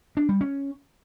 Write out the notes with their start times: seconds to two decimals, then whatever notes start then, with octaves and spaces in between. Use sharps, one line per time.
0.17 D4
0.29 G3
0.41 C#4